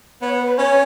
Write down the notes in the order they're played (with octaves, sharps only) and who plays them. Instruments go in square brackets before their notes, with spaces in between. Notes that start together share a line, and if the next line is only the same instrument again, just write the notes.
[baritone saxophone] B3 [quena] C#5
[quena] B4
B4
[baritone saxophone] C#4 [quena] C#5